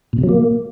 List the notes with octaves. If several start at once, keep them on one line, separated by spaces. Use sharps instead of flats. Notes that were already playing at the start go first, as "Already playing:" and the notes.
A#2
B2
F#3
A#3